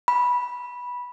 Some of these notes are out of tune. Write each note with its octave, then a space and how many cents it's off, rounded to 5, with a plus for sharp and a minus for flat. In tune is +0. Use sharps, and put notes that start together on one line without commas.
B5 -10